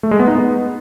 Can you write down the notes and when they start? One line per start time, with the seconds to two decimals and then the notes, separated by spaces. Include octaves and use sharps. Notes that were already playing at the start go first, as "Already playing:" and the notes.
0.03 A3
0.11 G#3
0.19 B3
0.27 D#4
0.35 B3